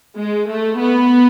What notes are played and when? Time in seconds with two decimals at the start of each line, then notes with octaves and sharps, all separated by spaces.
0.17 G#3
0.48 A3
0.80 B3